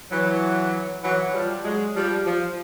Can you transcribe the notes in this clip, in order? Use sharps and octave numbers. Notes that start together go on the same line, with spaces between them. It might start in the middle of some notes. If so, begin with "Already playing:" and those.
E3 F#3
E3 F#3
F3 G3
F#3 G#3
F3 G3
F3